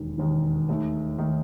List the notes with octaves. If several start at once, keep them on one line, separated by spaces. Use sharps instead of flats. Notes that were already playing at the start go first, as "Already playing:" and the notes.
Already playing: E1 D#2 D#3
E1 D#2 D#3
D#2 D#3 A3 D#4
D#3 A3 D#4